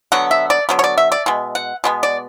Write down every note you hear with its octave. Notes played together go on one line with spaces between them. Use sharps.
D3 F#3 B3 F#5
E5
D5
D3 F#3 B3
C#5
D5
E5
D5
B2 G#3
F#5
B2 G#3 B3
D5